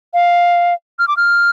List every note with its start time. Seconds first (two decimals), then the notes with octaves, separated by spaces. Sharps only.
0.14 F5
0.99 F6
1.08 D6
1.17 F6